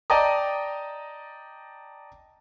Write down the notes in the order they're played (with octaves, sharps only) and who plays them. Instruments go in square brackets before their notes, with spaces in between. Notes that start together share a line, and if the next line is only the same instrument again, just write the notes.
[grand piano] D5 D#5 G5 A5 A#5 D#6